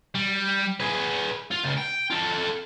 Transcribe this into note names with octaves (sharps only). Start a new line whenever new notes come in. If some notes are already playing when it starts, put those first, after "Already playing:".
G3
G#4 B4
F4
C#2
G5
F4 A4